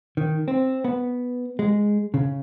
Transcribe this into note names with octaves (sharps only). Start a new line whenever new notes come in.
D#3
C4
B3
G#3
C#3